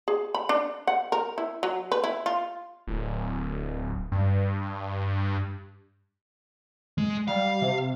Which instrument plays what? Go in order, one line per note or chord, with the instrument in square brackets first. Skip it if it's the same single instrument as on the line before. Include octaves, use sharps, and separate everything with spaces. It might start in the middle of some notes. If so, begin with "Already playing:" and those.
[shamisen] G#4
B5
D4
F#5
A#4
E4
F#3
B4
E4
F4
[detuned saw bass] D1
G2
[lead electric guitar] G#3
[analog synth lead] G3 [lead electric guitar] F5
[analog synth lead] C3